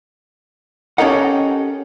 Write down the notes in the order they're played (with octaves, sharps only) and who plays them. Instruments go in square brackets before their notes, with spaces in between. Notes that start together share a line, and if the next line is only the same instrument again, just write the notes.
[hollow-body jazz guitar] C#4 G4 A4 A#4 D#5 F#5